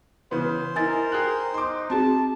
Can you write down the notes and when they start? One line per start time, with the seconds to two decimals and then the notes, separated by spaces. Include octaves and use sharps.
0.31 C#3 E3 B3 C5
0.76 D#4 E4 A#4 G#5 A6
1.12 G#4 G5 F#6
1.54 D#4 C6 D6
1.90 C4 F#4 G#4 A5